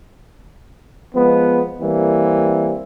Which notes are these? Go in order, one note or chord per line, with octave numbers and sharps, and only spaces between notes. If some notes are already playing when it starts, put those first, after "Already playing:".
F3 G#3 B3
E3 G3 A#3 C4